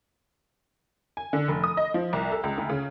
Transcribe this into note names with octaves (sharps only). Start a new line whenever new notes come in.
G#5
D3
F1
D#6
D#5
F3
C2
A4
C#2
D2
C#3